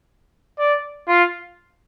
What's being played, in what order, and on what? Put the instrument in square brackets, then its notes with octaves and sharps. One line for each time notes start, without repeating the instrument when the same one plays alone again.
[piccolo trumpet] D5
F4